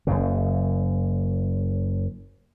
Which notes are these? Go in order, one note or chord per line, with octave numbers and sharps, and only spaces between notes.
F#1 F#2 C#3